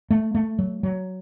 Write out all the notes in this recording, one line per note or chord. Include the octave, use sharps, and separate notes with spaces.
A3
A3
F#3
F#3